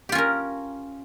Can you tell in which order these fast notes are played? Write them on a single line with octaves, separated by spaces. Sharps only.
G4 F4 C#4 A#4